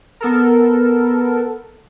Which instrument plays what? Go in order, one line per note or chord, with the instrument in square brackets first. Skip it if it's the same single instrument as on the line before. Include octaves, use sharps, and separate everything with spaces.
[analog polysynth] B3 A4 A#4